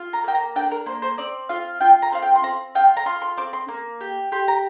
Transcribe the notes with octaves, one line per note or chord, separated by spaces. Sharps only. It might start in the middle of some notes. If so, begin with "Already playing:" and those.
Already playing: F4
A#5
A#3 G5
A#5
D4 G5
A#4
A#3 C5
C5
C4 D5
F4 F5
F4 G5
A#5
C4 F5
G5
C6
C4 A#5
F4 G5
A#5
F4 C6
C6
C4 D6
C6
A#3
G4
G4 C6
A#5